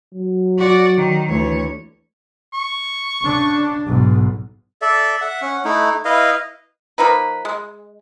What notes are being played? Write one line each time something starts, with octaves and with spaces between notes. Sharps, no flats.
F#3
F#4 D5
D#3
D2 E3 C#5
C#6
C#3 D4
B1 G#2
A4 D5 E5
E5 F#5
C#4 F#5
A3 D#4 E4
E4 B4 D#5 F5
F3 A#3 D#4 B4
G#3